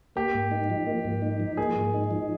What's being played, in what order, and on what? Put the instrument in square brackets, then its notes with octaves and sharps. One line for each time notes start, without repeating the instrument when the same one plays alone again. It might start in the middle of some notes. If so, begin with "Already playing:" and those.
[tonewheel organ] A#3 [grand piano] G4
[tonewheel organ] G#2
D#4
F3
A#3
G#2
D#4
F3
[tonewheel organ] A#3 [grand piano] G#4
[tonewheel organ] G#2
D#4
F3